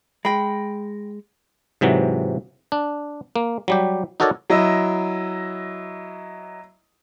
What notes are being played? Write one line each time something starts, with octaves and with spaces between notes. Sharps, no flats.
G#3 G5 B5
G#2 C3 E3 F#3
D4
A#3
F#3 G3 G4
D#4 F#4 A4 A#4 C#5 D5
F#3 E4 D#5